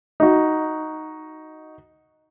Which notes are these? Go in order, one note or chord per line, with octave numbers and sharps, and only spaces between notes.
D#4 F#4